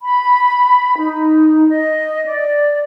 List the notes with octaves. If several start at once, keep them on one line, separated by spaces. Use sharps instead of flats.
B5
D#4
D#5
D5